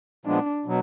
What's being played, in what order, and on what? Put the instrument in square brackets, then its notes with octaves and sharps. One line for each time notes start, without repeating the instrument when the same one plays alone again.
[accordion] A#2 F3 G#3 B3 [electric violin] D4
[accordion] B2 F#3